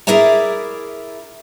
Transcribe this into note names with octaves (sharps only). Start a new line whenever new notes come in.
E4 G#4 A#4 D5 E5 A#5